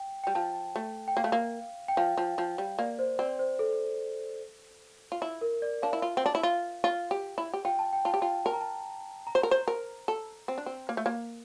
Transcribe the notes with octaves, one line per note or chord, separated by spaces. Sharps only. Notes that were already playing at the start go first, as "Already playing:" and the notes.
Already playing: G5
G3 G5
F3 A5
A3
G5
A#3 F5
A3
A#3
G5
F3 F5
F3
F3
G3
A#3 D5
C5
C4 D5
C5
A4
F4
E4
A#4
D5
D4 F5
E4
F4
C4
D4
E4
F4
F4
G4
E4
G4
F4 G5
A5
G5
F4 A5
G4
F4 G5
A#4 A5
A#5
A5
A#5
C5
A#4
C5
A#4
A4
C4
D4
C4
A#3
A3
A#3